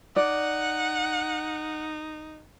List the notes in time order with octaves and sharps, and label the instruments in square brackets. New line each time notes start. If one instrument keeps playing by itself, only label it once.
[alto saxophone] D#4 [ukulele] D5 [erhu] F#5